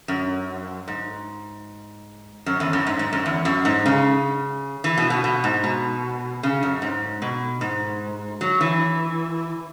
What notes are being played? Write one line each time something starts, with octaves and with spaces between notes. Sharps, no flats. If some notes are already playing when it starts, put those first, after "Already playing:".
F#2
G#2
F#2
E2
F#2
G#2
G#2
F#2
E2
F#2
G#2
C#3
E3
B2
B2
B2
G#2
B2
C#3
F#2
G#2
B2
G#2
F#3
E3